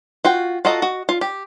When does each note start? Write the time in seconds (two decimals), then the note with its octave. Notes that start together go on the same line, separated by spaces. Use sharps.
0.25 F4 F#4 G5
0.65 F4 F#4 A4 D#5 A#5
0.82 F#4 D#5
1.09 F4
1.21 G4